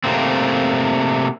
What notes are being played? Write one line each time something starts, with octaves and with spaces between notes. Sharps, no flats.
C3 A3 A#3 C4